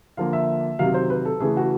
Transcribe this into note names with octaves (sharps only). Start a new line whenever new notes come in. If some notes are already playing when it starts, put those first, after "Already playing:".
D3 F3 A#3 F5
E5
C3 D#3 F#3 F5
C5
B4
A4
C#3 E3 A3 G#4
F#4